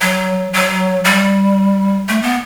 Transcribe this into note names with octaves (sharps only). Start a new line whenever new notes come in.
F#3
F#3
G3
A3
B3